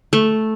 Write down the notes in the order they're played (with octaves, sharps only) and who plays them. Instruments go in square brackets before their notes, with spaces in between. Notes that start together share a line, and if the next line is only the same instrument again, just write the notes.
[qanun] A3